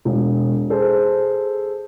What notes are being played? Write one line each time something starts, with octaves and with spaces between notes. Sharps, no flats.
E1
G#4 A4 C5